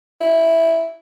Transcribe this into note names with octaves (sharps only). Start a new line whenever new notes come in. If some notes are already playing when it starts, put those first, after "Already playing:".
E4